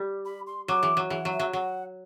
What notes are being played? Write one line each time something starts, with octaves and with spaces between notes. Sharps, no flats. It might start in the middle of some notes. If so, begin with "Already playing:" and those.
Already playing: G3
B5
C6
F#3 D6
E3
F#3
E3 F#5
F#3
E5
F#3
F#3 F#5